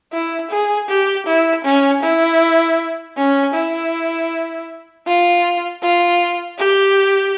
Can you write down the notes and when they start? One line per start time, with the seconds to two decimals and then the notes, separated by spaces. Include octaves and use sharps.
0.13 E4
0.51 G#4
0.89 G4
1.27 E4
1.64 C#4
2.03 E4
3.17 C#4
3.54 E4
5.07 F4
5.82 F4
6.58 G4